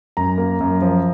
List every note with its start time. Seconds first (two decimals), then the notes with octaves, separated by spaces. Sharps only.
0.17 F#2 A#5
0.38 A#3
0.60 F#2
0.82 F3